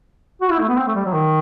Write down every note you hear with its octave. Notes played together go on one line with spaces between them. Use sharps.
F#4
E4
A3
B3
C4
A3
G3
F#3
D#3